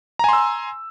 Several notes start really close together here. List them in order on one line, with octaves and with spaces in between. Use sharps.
A#5 G#5 C6 E6